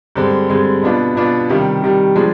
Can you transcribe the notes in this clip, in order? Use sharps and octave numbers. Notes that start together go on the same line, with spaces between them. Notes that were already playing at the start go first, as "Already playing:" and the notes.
G2 D3 G#3 C4
G2 D3 G#3 C4
B2 B3 D4 F4
B2 B3 D4 F4
C3 D#3 G3
C3 D#3 G3
F3 G#3 D4